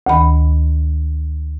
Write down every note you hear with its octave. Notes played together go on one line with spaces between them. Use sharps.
D2 D#3 B5